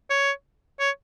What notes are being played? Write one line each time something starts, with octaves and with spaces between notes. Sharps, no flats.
C#5
C#5